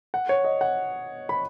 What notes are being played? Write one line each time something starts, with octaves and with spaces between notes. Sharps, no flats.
F#5
C#5
D#5
F#5
B5